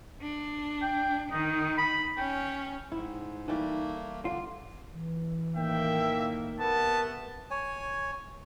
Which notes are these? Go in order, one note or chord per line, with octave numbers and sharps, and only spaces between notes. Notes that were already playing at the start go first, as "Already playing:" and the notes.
D4
G5
D#3 D#4
B5
C#4 G5
G#2 E4
E3 G3 A3 A#3 D#4
D3 F4
E3
A2 D#3 A#3 E5 G5
C3 A3 B3 A#4 A5
C#5 G#5